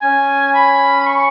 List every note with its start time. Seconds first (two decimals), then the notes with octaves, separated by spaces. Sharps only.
0.02 C#4 G#5
0.54 B5
1.01 B5
1.06 C#6